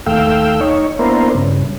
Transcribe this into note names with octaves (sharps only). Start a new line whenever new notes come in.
D#2 A3 F5 G5 E6
D#4 C#5
A#3 B3 D4 E4 A#4 C5
G2 C#3